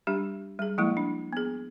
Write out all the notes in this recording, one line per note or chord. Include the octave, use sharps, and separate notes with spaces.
G3 D4 G4
G3 G#4
F3 G#3 A#3 E4
D4
B3 G#4